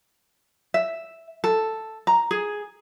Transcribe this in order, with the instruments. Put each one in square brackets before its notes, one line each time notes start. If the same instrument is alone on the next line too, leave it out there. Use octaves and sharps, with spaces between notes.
[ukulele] E5
A4
A#5
G#4